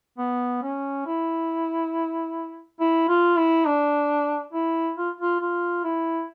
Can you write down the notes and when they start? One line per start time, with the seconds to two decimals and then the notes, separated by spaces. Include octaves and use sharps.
0.18 B3
0.62 C#4
1.06 E4
2.80 E4
3.08 F4
3.37 E4
3.66 D4
4.53 E4
4.97 F4
5.20 F4
5.40 F4
5.84 E4